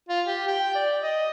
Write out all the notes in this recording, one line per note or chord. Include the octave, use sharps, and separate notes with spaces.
F4
G4
G5
D5
D#5